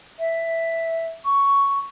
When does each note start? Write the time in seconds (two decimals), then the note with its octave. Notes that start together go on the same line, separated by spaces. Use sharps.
0.19 E5
1.25 C#6